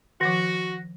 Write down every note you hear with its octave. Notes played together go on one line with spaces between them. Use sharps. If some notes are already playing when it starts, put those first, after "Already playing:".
D#3 F3 F#4 A#6